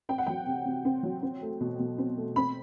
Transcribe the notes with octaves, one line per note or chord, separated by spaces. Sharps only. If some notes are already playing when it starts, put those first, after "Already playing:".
C4 G5
F#5
F#3 G5
C3
C3
C4
F#3
C4
A3
B2
B2
C4
A3
C4 B5